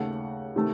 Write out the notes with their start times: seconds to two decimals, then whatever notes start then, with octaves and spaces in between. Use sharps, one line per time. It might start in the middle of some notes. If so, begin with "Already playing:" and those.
Already playing: D#2 C#3 A3 F#5
0.56 C3 D#3 A3